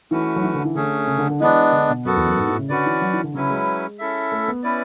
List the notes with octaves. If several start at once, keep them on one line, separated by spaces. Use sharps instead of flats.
E3 A3 C#4 F#4 B4
F#3
E3
D3
E3
D3 A3 C#4 G#4
C#3
D3
D3
E3 G#3 B3 D4
D3
B2
F#2 B3 F#4 A4
E2
F#2
G#2
A2
C#3
D3 C#4 F#4 B4 D5
E3
F#3
E3
D3
C#3 F#3 C#4 E4 B4
G#3
C#4 E4 A4 E5
A3
B3
C#4 E4 B4 D5